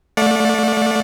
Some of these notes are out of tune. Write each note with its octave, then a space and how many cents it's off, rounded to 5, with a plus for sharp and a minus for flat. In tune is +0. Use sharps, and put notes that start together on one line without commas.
A3 +0 D5 +0 F#5 -45